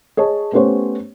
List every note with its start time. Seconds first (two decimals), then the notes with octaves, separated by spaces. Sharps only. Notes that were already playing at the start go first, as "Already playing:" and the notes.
0.17 G#4 C#5 D#5 A5
0.52 A3 B3 C#4 G4 C5 C#5